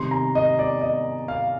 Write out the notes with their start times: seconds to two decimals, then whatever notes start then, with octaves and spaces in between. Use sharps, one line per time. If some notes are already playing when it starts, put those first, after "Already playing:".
Already playing: C3 D#3 G3 C6
0.11 A#5
0.35 D#5
0.59 D5
0.81 D#5
1.28 F5